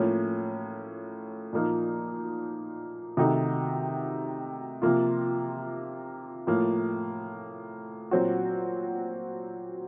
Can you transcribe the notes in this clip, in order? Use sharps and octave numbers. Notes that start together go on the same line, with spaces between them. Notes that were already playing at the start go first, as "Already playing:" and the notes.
Already playing: A2 F3 A#3 C#4
A#2 F3 A#3 D#4
C3 D#3 A3 D#4 F#4
C3 F3 A#3 F4
A2 F3 A#3
A#2 F#3 C4 F#4